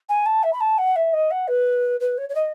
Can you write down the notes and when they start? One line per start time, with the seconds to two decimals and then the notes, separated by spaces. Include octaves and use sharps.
0.09 G#5
0.26 A5
0.43 E5
0.53 B5
0.61 A5
0.78 F#5
0.96 E5
1.13 D#5
1.31 F#5
1.48 B4
2.00 B4
2.18 C#5
2.29 C#5
2.35 D#5